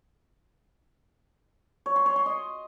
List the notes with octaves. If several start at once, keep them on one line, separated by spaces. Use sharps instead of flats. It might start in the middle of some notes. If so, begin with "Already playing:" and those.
C#5
C6
C#5
C6
D#5